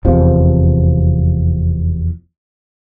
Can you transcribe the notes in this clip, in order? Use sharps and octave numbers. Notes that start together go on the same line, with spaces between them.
F1 E2 C3 F3